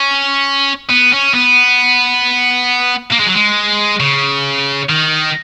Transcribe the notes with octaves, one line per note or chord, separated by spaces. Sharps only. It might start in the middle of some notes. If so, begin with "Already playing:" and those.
Already playing: C#4
B3
C#4
B3
A#3
G#3
F#3
G#3
C#3
D#3